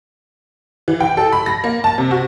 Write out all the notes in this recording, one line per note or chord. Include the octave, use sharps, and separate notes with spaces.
E3
G5
A4
B5
A#6
A#3
A5
C3
F#4